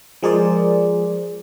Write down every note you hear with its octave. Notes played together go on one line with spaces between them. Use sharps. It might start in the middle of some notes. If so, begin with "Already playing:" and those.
F3 G#3 G#4 A#4 C5 D5